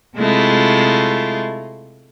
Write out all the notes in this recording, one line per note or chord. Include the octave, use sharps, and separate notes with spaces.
C3 G#3 A3 E4 F4